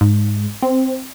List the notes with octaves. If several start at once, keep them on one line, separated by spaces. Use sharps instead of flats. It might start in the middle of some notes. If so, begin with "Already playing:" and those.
G#2
C4